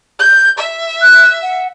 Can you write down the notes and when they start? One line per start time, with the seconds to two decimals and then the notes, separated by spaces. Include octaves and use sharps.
0.20 G6
0.59 E5
1.01 F#6
1.42 F#5